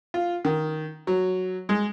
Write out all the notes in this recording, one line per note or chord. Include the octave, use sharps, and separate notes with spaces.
F4
D#3
F#3
G#3